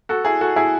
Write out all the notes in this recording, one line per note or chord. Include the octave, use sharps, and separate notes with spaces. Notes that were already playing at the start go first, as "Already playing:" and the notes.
F#4 A4
E4 G#4
F#4 A4
E4 G#4